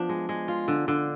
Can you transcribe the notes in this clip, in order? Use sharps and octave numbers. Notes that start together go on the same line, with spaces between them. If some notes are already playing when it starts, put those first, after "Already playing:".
Already playing: F3 B3 D4
G#3
G#3
F4
D3
D3